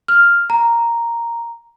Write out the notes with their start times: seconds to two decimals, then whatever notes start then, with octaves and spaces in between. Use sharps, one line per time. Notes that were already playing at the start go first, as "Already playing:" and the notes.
0.08 F6
0.50 A#5